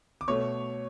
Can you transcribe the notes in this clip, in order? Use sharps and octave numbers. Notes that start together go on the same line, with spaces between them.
D6
B2 A3 C#5 C#6